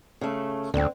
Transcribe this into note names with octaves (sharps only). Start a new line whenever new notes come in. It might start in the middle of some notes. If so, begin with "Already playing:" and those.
C#3 A3
D2 D3 C4